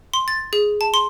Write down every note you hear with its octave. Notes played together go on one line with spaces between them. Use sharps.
C6
A6
G#4
A5
C6